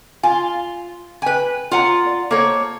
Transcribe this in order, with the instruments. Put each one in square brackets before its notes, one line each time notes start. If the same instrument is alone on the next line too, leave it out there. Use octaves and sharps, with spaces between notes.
[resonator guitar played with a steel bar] F4 [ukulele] G#5
[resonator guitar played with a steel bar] B4 G#5 [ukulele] G5
[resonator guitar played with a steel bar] F4 F#5 [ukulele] C#5 A#5
[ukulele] D5
[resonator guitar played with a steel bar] A#3 C#5 [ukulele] A4 C5